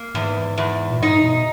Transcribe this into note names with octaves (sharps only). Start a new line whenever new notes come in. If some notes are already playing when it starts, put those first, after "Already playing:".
Already playing: A#3
E2 G#2
E2
A#2
G#2 D#4
B2